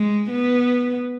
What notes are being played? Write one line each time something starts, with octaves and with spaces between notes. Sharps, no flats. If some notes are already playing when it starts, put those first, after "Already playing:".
Already playing: G#3
B3